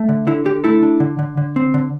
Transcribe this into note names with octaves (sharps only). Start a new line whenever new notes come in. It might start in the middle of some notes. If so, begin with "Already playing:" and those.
Already playing: A3
D3
D3 E4
D3 G4
A3 E4 A4
D4
D3
D3
D3
C4
D3